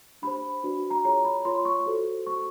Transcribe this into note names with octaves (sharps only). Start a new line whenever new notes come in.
D4 G4 C5 B5
D4 F#4 B4 D5
A#5
F4 G#4 C#5 A#5
B5
F4 A#4 C#5 C6
C#6
F#4 A4 C5
F#4 A4 C5 C#6